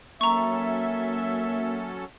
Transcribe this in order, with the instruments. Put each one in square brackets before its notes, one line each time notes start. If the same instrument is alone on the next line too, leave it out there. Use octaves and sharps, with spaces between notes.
[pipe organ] F#3 C#4 A4 [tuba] A#3 [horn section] E5 [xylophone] A#5 C#6